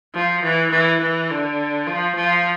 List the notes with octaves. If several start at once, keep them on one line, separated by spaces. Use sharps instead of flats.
F3
E3
E3
E3
D3
F3
F3